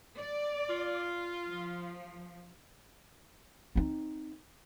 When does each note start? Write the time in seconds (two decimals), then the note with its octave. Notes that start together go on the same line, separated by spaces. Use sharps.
0.19 D5
0.70 F4
1.46 F3
3.75 C4 D#4